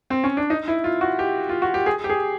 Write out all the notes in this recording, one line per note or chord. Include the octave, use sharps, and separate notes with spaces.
C4
C#4
D4
D#4
E4
F4
F#4
G4
F4
F#4
G4
G#4
G4
G#4